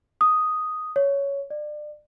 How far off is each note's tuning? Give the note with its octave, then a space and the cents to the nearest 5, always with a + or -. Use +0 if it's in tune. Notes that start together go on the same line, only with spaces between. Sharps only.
D#6 +0
C#5 +10
D5 +30